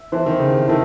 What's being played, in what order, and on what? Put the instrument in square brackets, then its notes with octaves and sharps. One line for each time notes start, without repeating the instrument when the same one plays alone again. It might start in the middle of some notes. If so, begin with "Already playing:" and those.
Already playing: [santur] E5
[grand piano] E3 [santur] E4 A4 C5
[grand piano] D#3
C#3
C3
[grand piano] D#3 [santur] E4 A4